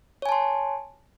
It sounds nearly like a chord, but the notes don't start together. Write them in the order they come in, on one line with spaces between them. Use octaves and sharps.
C#5 G#5 A5 C6